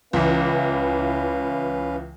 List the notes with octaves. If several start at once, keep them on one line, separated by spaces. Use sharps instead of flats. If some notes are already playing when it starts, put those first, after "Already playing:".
C#2 E3 C#4 B4 F5